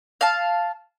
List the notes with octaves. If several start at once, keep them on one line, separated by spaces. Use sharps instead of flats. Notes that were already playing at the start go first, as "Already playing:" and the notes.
F5 A5